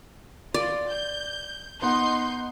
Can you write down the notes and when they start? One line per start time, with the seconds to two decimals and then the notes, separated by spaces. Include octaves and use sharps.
0.54 F4 D5
0.88 G6
1.82 B3 D#4 F#5 C6 G6